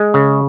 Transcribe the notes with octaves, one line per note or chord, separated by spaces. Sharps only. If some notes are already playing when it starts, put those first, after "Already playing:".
Already playing: G#3
C#3